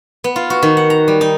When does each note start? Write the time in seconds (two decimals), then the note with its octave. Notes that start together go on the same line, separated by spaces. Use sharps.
0.24 B3
0.36 F4
0.50 F#4
0.63 D#3
0.77 F#5
0.90 A#5
1.08 G3
1.21 D#4